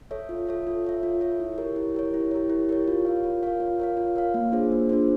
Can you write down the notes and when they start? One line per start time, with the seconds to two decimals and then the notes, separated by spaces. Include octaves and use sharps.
0.11 A4 C#5 E5
0.29 F4
0.47 A4 C#5 E5
0.67 F4
0.85 A4 C#5 E5
1.03 F4
1.21 A4 C#5 E5
1.40 E4
1.58 G4 A#4 C#5
1.76 E4
1.95 G4 A#4 C#5
2.14 E4
2.31 G4 A#4 C#5
2.50 E4
2.69 G4 A#4 C#5
2.88 F4
3.05 A#4 C#5 F5
3.24 F4
3.43 A#4 C#5 F5
3.60 F4
3.80 A#4 C#5 F5
3.97 F4
4.16 A#4 C#5 F5
4.34 A#3
4.52 D4 F4 G#4 C5
4.72 A#3
4.89 D4 F4 G#4 C5